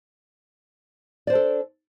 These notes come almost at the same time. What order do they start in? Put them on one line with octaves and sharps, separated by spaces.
D5 C5 D4 A4